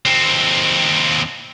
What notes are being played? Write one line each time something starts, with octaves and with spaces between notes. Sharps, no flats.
D#2 C4